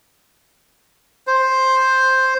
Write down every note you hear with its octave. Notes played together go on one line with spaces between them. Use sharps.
C5